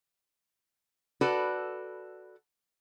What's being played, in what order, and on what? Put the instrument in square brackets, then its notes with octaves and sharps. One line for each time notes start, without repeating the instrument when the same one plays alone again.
[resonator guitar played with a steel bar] F#4 A4 B4 D5